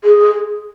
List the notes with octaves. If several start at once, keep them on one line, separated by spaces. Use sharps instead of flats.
G#4